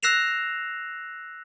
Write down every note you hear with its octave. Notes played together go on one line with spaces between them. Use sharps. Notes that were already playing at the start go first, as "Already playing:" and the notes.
E6 F#6 A#6 C7 E7 F7